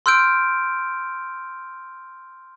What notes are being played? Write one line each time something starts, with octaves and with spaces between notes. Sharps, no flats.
C6 E6 F6 G6 D7